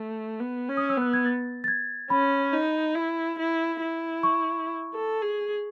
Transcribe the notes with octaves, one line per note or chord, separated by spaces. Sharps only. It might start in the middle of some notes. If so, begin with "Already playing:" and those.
Already playing: A3
B3
C#4
D#6
E6
B3 F#6
G#6
A6
A6
G#6
C#4 B5
D#4
E4
E4
E4
C#6
A4
G#4